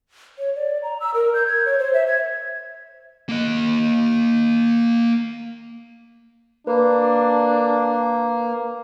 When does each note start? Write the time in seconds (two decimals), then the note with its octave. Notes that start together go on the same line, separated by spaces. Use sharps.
0.39 C#5
0.55 D5
0.83 A#5
1.00 E6
1.14 A#4
1.34 G6
1.47 G#6
1.65 C#5
1.79 C5
1.94 E5
2.07 G#6
3.29 A#3 D#5
6.67 A#3 D4 B4